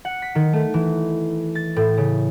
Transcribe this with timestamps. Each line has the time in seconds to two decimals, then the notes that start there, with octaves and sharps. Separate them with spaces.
0.05 F#5
0.22 B6
0.35 D#3
0.53 A3
0.74 E3
1.55 A6
1.76 A2
1.97 C#3